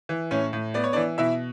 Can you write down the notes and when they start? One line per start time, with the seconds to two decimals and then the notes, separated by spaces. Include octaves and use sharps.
0.09 E3
0.31 A2 C#4 C#5
0.53 A2
0.74 B3 D5
0.84 C#5
0.93 D4 D5
0.96 E3
1.18 B2 E4 E5